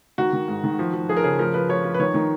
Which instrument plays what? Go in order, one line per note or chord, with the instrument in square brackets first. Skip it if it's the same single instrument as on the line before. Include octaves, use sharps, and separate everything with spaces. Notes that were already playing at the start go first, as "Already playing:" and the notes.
[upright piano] D#3 F#4
D#3
G#2
D#3
F3
F3
F3 G#4
A#4
C#3 G#4
F3 A#4
F3 B4
F3 C#5
F3
B4
D#3 C#5
D#3